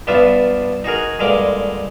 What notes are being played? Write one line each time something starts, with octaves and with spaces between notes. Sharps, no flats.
G2 B3 D4 F4 E5
D#4 F#4 G#4 A#4
G2 A#2 D3 G#3 A#4 D6